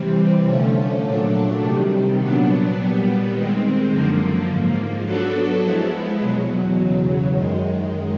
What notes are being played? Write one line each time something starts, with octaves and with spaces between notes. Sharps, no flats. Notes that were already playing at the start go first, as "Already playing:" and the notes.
Already playing: C3 E3 G3 C4
D3 F3 A3 C#4
A#2 F#3 A3 D4
C3 D#3 G3
A#2 F#3 B3 D4
A#2 G3 B3
D#3 G#3 C4
F#2 D3 F3 A#3
G#2 F3 A#3
F#3 B3 D4 F#4 A4
F3 G#3 B3 E4
E2 B2 F#3
E2 C#3 F#3
F#2 D#3 G#3